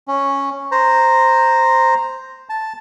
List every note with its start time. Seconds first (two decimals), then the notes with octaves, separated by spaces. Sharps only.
0.08 C#4
0.72 C5 A#5
2.49 A5